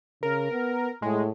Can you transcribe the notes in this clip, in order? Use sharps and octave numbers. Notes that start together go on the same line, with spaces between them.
C#3 A#4
B3
A2 G#3